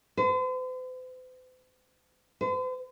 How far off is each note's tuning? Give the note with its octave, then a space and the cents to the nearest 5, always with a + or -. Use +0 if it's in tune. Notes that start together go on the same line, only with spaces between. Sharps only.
C5 -45
C5 -45